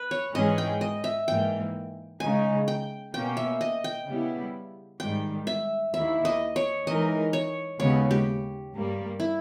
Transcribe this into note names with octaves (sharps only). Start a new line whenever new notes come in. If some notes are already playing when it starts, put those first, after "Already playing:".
Already playing: B4
C#5
G#2 E3 G#3 C#4 G#4 D#5
G5
D#5
E5
G#2 E3 A#3 G5
C#3 G#3 D#4 G#5
G5
B2 A#3 C#4 G5
E5
D#5
G5
C#3 G3 B3 E4 G4
G#2 D#3 G3 G5
E5
D#2 D#3 A#3 E4 E5
D#5
C#5
E3 G#3 D#4 A#4 D#5
C#5
D#2 C#3 G#3 B3 C#5
G4
G2 G3 A#3
E4